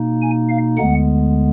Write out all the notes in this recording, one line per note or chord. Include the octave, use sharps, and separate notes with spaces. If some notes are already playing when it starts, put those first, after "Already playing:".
Already playing: B2 A#3 D#4
G#5
F5
D2 D3 G#3 B3 F#5